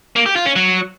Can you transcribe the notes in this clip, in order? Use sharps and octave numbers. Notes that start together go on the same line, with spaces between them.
A#3
G4
F4
C#4
F#3